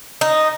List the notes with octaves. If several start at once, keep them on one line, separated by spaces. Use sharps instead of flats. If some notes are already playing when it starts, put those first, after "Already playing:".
D#4